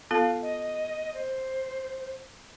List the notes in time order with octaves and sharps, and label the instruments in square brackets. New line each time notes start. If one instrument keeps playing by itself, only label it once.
[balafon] B3 F4 A4 [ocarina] F5
[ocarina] D#5
C5